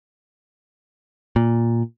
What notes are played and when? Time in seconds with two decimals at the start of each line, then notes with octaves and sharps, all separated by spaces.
1.36 A#2